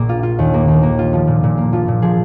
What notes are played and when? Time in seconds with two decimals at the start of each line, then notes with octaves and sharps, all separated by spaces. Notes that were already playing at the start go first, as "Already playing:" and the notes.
Already playing: A#1 A#2 A#3 G#4
0.09 F4
0.23 F4
0.39 D#2
0.54 A#3
0.68 D#2
0.83 A#3
0.99 F4
1.13 F3
1.28 A#2
1.43 A#2
1.57 A#3
1.73 F3 F4
1.88 A#2
2.02 F3 G#4